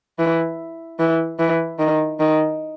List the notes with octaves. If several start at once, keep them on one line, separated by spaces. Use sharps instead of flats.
E3
E3
E3
D#3
D#3